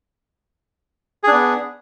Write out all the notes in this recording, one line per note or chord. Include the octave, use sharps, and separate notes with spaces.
B3 D4 G#4